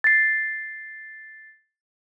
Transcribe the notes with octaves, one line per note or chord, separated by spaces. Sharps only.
A6 C7